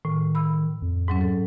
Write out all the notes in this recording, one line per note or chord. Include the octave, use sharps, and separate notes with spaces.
A2 D#3
B5 E6
F2
G#2 F#3 C#4
A4